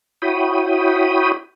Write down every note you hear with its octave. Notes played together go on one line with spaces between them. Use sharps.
E4 F#4 C#5 G5 B5 D#6